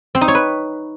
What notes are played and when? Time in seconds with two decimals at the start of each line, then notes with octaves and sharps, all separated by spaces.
0.15 C4
0.21 D#4
0.28 C#5
0.35 B4